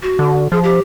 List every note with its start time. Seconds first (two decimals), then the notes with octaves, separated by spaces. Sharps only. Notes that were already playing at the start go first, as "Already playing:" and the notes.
0.03 F#4
0.19 D3
0.52 F3 G#4
0.64 G4